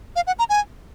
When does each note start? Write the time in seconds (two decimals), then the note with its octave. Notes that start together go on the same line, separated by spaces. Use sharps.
0.16 F5
0.27 F#5
0.39 A#5
0.50 G#5